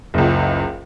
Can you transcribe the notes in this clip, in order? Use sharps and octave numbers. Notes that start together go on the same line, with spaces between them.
F#1 C#2